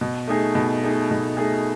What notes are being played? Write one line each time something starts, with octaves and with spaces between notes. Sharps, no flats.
B2
A3 D#4 G#4
B2
A3 D#4 G#4
B2
A3 D#4 G#4